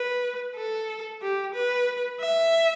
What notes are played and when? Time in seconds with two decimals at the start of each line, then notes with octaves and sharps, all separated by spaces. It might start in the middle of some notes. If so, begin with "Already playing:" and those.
Already playing: B4
0.56 A4
1.22 G4
1.55 B4
2.20 E5